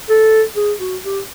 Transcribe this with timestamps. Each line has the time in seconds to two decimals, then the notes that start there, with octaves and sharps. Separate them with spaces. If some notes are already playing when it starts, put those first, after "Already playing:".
0.09 A4
0.56 G#4
0.80 F#4
1.03 G4